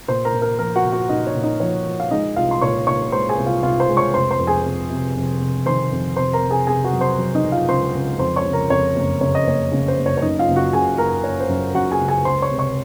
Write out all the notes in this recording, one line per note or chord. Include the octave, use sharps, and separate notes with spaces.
A#2 C5 C6
A#4 A#5
A#2
A#4 A#5
F3 A#4 A#5
F#4 F#5
A#2
F#4 F#5
A#2 D#4 D#5
C#5
A#2
D#4 D#5
F3 C#5
F3
F5
G#3 D#4 D#5
C2 F4 F5
C6
A#2 C#5 C#6
A#2 C#5 C#6
G#3 C5 C6
G#4 G#5
C2
F4 F5
C2 F4 F5
C5 C6
G#3
C#5 C#6
F1 C5 C6
C5 C6
F2
G#4 G#5
F1
C3
F2
F1
D#3 C5 C6
F2
C3 C5 C6
A#4 A#5
C3
G#4 G#5
C3 G#4 G#5
F#4 F#5
F#3
C5 C6
F#3
D#4 D#5
F#3
F4 F5
C#2 C5 C6
C#2
F2 C5 C6
C#5 C#6
C#3
A#4 A#5
F2 C#5
F#1
C#3 C#5
D#5
F#1 C#5
C#3
C5
F#1
C#5
C#5
F#2 D#4 D#5
F4 F5
F#1
F#4 F#5
F#2 G#4 G#5
F#1 A#4 A#5
F#1 C#5
C5
F#2
F#2 F#4 F#5
G#4 G#5
C#3
G#4 G#5
C#2 C5 C6
C#5 C#6
C3
C#5 C#6